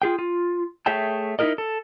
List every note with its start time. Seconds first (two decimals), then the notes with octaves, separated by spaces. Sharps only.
0.02 F4 G#4 G5
0.19 F4
0.86 A3 G#4 C#5 E5 G5 A5
1.39 D#4 E4 G4 G#4 A#4 D#5
1.58 A4